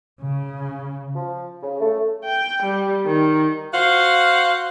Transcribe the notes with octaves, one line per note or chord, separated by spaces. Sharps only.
C#3
F3
C#3
A3
G5
G3
D#3
F#4 C5 F5 F#5